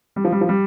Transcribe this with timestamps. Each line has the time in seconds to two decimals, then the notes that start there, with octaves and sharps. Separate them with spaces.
0.16 G3
0.25 F3
0.32 G3
0.41 F3
0.49 G3